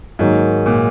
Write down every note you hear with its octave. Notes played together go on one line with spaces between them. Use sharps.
G#2 D#3 F#3 A#3 D#4
A#2